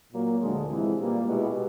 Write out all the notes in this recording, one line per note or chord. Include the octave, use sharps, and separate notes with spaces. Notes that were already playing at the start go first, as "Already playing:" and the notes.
A#2 F#3 A#3
D2 D3 F3 G#3
C3 E3 G#3
A#2 G3 A#3
B2 G#3 B3 E4 G4